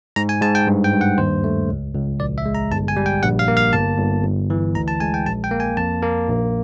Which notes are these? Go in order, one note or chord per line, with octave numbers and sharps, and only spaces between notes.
G#2 A#5
G#5
G#2 A5
G5
G2
G5
G2
F#5
D#2 C5
A3
C#2
C#2
A#1 D5
E5
G#3
A#5
G1 A5
G#5
G3
G5
A#1 F#5
F5
A#3
F5
G1 A5
G1
G1
E3
D2 A#5
A5
G#3 G#5
G5
A#1 A5
G5
A#3
G#5
F2 A5
A#3
A#1